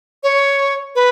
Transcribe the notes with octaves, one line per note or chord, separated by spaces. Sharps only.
C#5
B4